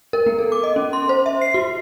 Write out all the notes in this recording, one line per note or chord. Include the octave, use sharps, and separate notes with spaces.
A#4
B3
A4
D6
D#5
C#4
C6
C5
E5
C7
F#4